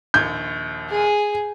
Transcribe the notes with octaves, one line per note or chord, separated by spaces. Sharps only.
A#1 D#2 G6 G#6
G#4